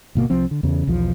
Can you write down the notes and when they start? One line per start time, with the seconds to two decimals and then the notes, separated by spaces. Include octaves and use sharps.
0.15 G1 B2 A#3
0.30 C2 F3 C4
0.51 D3
0.63 E2 C#3
0.87 B1 E2 F3